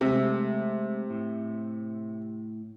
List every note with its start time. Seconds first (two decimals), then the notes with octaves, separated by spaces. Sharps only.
0.01 C3 G#3 A3 E5
1.10 A2